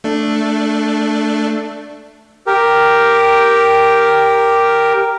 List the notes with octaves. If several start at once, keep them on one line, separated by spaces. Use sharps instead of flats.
A3 D4
G4 A#4